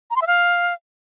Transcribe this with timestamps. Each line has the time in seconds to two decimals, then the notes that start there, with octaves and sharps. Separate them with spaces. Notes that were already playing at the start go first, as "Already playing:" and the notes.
0.11 A#5
0.16 C6
0.21 E5
0.27 F5